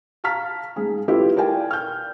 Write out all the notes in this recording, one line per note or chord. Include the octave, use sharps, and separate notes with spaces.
F5 A5 A#5 F6 B6
G#2 G#4
E4 F4 G4 A4 B4 E5
A#4 D5 F5 G5 G#5
F6 G6